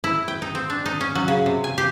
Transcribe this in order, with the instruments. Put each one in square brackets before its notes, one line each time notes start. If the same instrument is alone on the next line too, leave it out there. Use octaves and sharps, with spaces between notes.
[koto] E4
G5
D#4
C4
D4
D#4
C#4
F#3
C#3
C3
G#5
G4